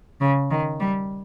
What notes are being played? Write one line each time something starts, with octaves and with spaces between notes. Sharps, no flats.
C#3
D#3
G3